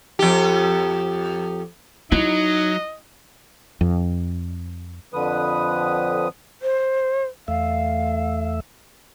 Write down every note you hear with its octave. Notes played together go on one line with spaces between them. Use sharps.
F2 G4
F#3 D#4 E4 D#5
F2
F2 D3 F3 B4 D#6
C5
E2 A3 E5 F5